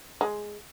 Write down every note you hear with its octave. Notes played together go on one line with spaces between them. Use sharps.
G#3